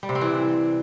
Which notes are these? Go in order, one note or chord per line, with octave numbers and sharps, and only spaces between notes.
G3
C3
C4
E3